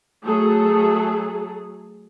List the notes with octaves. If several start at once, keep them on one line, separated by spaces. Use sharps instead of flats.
F#3 A3 G#4 A4